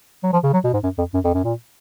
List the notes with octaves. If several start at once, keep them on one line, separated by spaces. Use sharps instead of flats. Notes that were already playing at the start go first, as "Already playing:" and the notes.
F#3
F3
C#3
F#3
B2
G#2
F#2
F2
F#2
F2
F#2
A#2